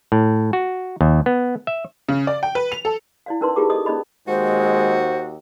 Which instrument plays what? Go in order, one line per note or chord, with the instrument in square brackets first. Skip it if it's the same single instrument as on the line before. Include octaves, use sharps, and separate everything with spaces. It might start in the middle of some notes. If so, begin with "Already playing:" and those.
[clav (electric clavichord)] A2
F#4
D#2
B3
E5
[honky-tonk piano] C#3
D5
G5
B4
F7
A4
[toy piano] E4 D5 F5
C#4 D#4 A#4 B4 D5 C6
D#4 F4 G4 G#4 A#4 D6
A4 D5 D#5 D#6
C#4 D#4 D5 D#5 B5
[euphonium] D#2 [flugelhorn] G#3 [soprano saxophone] F#4 [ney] C5